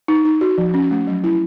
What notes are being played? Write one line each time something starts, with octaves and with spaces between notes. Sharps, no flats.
D#4
D#4
F#4
F3
C#4
A3
F#3
E4